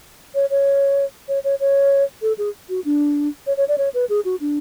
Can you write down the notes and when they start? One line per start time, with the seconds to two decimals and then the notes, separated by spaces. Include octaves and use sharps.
0.35 C#5
0.50 C#5
1.28 C#5
1.44 C#5
1.60 C#5
2.22 A4
2.38 G#4
2.69 F#4
2.85 D4
3.47 C#5
3.57 C#5
3.68 D5
3.78 C#5
3.94 B4
4.09 G#4
4.25 F#4
4.40 D4